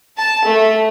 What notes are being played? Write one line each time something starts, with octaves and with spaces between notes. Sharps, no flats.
A5
A3